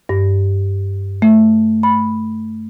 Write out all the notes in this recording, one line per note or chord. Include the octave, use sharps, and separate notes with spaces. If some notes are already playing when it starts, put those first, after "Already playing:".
G2
A3
B5